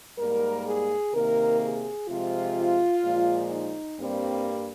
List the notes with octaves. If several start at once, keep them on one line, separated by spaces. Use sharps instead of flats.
G#2 G3 A#3 A#4
G#4
C3 D#3 A#3 A#4
G#4
C3 F3 G#3 F4
A#2 F3 G#3
D#4
G2 G3 A#3 C4